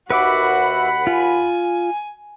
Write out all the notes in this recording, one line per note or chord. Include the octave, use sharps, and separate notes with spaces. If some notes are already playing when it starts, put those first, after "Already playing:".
D#2 F#4 B4 E5 F#5 B5 D6
F4 G#5